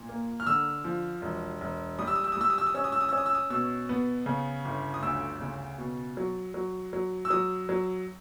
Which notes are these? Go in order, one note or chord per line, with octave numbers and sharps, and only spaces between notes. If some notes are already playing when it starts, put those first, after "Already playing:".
Already playing: A#2
A#3
F6
D3 E6
F3
E1
E1
G3 D#6
E6
D#6
E6
D#6
G3 E6
D#6
E6
D#6
C#4 E6
D#6
E6
D#6
E6
C#4 D#6
E6
D#6
B2 E6
B3
C#3
G1
D#6
D2 E6
C#3
B2
F#3
F#3
F#3
E6
F#3 D#6
F#3